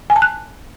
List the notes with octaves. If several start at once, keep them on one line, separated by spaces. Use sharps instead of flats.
G#5
A5
F#6